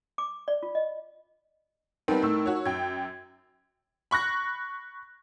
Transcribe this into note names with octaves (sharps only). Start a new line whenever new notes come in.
D6
D5
F4
D#5
G3 B3 C4 D#4 A#4
A2 E6
F#4 C#5
F#2 G5 G#6
B5 C#6 F#6 A#6